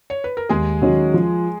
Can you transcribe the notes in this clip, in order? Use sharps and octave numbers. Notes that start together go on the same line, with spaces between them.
C#5
B4
A#4
D#2 G#3 G#4
D#3 F#3 C#4 F#4
F3